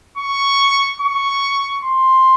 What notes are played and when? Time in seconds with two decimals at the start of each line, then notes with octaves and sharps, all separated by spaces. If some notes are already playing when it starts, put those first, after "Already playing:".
0.18 C#6
1.01 C#6
1.84 C6